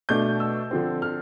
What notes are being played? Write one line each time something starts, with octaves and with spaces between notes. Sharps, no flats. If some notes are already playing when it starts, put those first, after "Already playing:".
B2 A3 D4 G6
E6
D3 F3 C4
F6